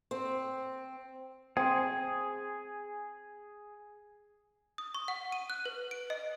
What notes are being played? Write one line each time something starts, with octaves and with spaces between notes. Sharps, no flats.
C4
C4 G#4
D#6
C#6
F#5
D#7
F#6
B4
D7
D#5